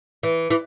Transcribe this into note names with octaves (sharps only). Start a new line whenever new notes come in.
E3
E3